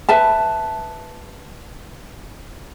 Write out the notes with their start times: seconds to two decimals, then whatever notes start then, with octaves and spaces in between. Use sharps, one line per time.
0.09 B4 E5 A5